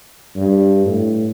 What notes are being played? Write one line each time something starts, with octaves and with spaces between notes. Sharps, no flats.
G2
A2